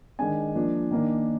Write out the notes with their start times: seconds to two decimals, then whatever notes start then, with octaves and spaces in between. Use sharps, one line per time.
0.19 D#3 G#3 D4 G#5
0.55 F3 A#3 D4
0.91 D#3 A#3 D4